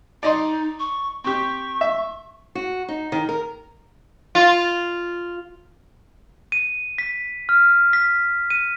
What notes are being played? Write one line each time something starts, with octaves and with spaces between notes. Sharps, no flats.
D#4 D5 D#5 C6
C#6
C4 G4 C#6
E5
F#4
D#4
D#3
A#4
F4
D#7
B6
F6
B6
D#7